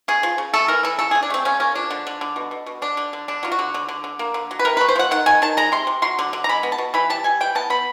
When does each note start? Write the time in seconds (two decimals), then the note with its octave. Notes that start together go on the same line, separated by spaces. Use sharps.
0.08 C#3 G#4
0.23 F3
0.38 C#3
0.54 A3 A4
0.68 E3 A#4
0.83 E3 A4
0.99 C#3 A4
1.11 C#3 G#4
1.23 D4
1.30 A3 C4
1.45 C#3 C#4
1.60 A#3 C#4
1.75 F3 D4
1.91 D3
2.07 D3
2.21 D3
2.36 B2
2.51 B2
2.66 B2
2.82 D3 D4
2.97 D3
3.13 D3
3.28 D3 D4
3.43 F#3 F4
3.52 F#4
3.59 D3
3.74 D3
3.89 D3
4.04 D3
4.19 A#3
4.34 D3
4.51 F#3
4.59 B4
4.65 C3 A#4
4.77 A3 B4
4.89 C5
4.96 F3 F#5
5.11 D#3 F#5
5.26 D#3 G#5
5.42 D#3 A5
5.57 G#3 A#5
5.72 C3 C6
5.87 C3
6.02 F#3 C6
6.19 D3
6.33 D3
6.44 A#5
6.49 G#3 B5
6.63 B3
6.72 A5
6.78 B2
6.94 E3 B5
7.10 G3 A5
7.24 G3 G#5
7.41 E3 G5
7.55 B3 A5
7.70 B3 B5